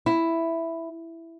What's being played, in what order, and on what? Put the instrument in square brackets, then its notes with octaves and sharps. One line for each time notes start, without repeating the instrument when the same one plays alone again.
[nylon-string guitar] E4